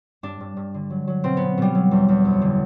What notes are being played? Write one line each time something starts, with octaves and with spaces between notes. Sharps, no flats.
G2 D4
G2
G2
D3
F#3
F#3
B2 C4
B2 B3
B2 G3
F#3
E2
E2
F#2
D3